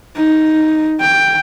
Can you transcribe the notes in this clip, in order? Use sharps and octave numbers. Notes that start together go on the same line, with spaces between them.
D#4
G5